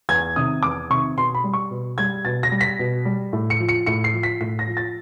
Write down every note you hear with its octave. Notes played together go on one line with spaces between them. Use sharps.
E2 G#6
C3 D#3 D#6
E2 D6
C3 D#3 C#6
B2 C6
B5
G3
C#6
B2
G3 G#6
B2 A6
A#6
G3
B6
B2
G3
A2
C#7
F3
C#7
A2 C#7
C7
F3
B6
A2 B6
A#6
F3
A6